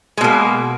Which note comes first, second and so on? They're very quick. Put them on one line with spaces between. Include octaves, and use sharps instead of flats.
G#3 B2 A#3